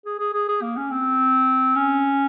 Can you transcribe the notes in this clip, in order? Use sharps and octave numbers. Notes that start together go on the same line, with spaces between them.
G#4
G#4
G#4
G#4
A#3
C#4
C4
C#4